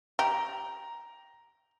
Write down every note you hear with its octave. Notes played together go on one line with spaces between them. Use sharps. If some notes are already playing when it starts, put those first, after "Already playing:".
G4 A#5